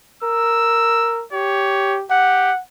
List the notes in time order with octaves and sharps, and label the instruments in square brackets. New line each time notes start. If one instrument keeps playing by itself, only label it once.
[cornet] A#4 [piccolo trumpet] E6
[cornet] G4 [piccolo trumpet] C#5
[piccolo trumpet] G4 [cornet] F#5